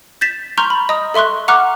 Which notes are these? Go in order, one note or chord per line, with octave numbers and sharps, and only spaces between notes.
G6 A6 B6 E7
A#5 C6 C#6 F6 G6
B5
D#5 A#5 D#6
A4 E5 C6 C#6 F#6
F#5 A#5 C#6 D6 F6 F#6